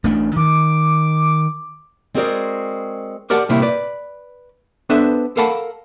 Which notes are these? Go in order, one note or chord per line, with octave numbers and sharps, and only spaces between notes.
A1 A3 D4
D#3 D6
G#3 C4 F#4 G#4 A#4 D5
G4 A#4 D5 F#5 A5
A2 C3 G3 A#3 E4
B4 D5
B3 D4 A4 B4 C5 E5
A4 A#4 F5 F#5 A5 B5